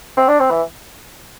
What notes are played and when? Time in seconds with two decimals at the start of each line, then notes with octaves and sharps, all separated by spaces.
0.17 C4
0.28 D4
0.40 C4
0.50 E3